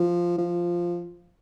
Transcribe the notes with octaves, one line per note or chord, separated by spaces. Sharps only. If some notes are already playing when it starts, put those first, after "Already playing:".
Already playing: F3
F3